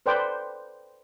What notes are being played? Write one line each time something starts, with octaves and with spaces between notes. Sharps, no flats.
A4 B4 C5 D5 G5